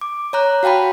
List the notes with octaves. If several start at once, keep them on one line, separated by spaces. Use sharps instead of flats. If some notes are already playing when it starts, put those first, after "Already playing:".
D6
C#5 A#5 F#6
F#4 F5 G5 A5 B5